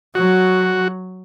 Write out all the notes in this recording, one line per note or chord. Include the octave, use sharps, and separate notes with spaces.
F#3 F#4